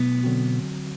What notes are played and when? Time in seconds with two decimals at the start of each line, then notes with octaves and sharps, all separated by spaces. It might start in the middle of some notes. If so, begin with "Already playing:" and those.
Already playing: B2 F#3 A3 B3 E4
0.23 D3 F#3 C4 F#4